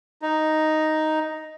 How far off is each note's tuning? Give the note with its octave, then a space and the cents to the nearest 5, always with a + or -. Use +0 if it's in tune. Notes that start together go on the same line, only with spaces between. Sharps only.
D#4 +0